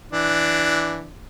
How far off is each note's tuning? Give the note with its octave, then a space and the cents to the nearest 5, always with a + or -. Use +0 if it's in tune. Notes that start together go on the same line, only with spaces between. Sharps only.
E3 +0 D4 +0